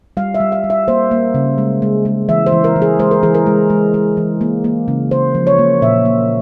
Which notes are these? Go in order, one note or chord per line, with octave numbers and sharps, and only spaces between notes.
G3 F5
E5
G3
F5
G3
E5
A#3 C5
A#3
C#3
G#3
G#3
G#3
E3 E5
C5
E3
A#4
E3
G#4
G#3 C5
A#4
E3 G#4
A#4
G#3
G#3
G#3
E3
A#3
A#3
C#3
C#3 C5
F3
C#5
A#3
A#2 E5
A#3